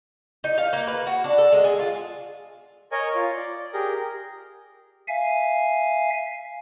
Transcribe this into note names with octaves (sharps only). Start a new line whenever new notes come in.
D#4
F5
A#3
B4
F#4
D4
A4
G#3
G#4
F4
A#4 C#5 D#5 G#5
F4
D5
G4 G#4 A#4
E5 F5 G#5